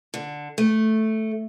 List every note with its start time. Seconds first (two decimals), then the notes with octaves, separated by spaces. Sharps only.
0.14 D3
0.58 A3